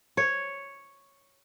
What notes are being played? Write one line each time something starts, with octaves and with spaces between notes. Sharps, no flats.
C#5